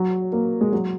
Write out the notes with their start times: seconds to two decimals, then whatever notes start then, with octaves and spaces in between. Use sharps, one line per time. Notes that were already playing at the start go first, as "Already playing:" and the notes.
Already playing: F#3
0.33 A#3
0.61 G#3
0.72 F#3